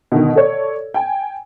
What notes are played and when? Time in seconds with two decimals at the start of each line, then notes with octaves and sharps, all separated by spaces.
0.12 B2 D3 D#3
0.35 A4 C#5 D5
0.94 G5 G#5